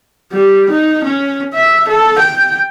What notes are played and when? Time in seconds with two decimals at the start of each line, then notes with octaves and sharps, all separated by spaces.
0.33 G3
0.70 D#4
1.04 C#4
1.54 E5
1.88 A4
2.19 G5